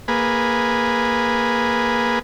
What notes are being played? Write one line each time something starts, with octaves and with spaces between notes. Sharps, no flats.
A#3 G#4 B4